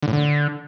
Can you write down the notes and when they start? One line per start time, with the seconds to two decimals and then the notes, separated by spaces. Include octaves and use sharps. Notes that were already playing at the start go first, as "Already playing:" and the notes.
0.03 D3
0.08 A2
0.13 D3